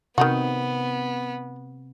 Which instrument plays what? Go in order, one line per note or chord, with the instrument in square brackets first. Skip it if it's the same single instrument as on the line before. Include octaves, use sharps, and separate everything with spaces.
[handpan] C3 [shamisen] D#3 D#4 F#4 [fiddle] B3